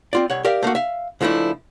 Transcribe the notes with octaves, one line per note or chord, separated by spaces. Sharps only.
C4 F4 D5
C2 C#5 F#5
G4 A#4 D5 E5 F5
A3 A#3 D4 F#4
E5 F5
C#2 F3 A3 D4 E4